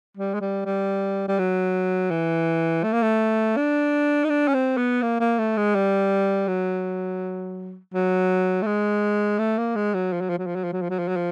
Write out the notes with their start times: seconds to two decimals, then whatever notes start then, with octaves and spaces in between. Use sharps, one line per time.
0.17 G3
0.34 G#3
0.41 G3
0.65 G3
1.28 G3
1.38 F#3
2.10 E3
2.83 A3
2.93 A#3
3.02 A3
3.57 D4
4.24 D#4
4.29 D4
4.48 C#4
4.54 C4
4.77 B3
5.02 A#3
5.20 A#3
5.38 A3
5.57 G#3
5.75 G3
6.47 F#3
7.94 F#3
8.62 A3
8.66 G#3
9.38 A3
9.58 A#3
9.75 G#3
9.94 F#3
10.12 F3
10.21 F#3
10.29 F3
10.38 F#3
10.46 F3
10.55 F#3
10.64 F3
10.72 F#3
10.82 F3
10.89 F#3
10.99 F3
11.08 F#3
11.16 F3